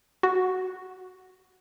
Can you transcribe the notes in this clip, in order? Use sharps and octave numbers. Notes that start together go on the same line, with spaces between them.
F#4